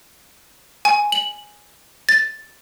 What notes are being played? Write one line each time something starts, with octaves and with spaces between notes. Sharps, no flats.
G#5
F#7
A6